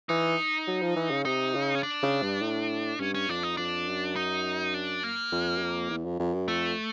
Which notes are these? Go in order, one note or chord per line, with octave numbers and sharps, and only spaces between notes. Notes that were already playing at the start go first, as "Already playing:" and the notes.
E3 D#4
F#3
F3
E3
C#3
C3 D#4
C#3
C#4
D4
C#3
G2
A2
G2 C#4
C#4
F2 D4
D#4
F2 D4
F#2
D#4
D4
A#3
F2
F#2
F2
E2
F2
F2
F#2
F2 A3